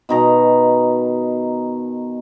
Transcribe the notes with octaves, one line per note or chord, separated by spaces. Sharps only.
B2 D#3 A#5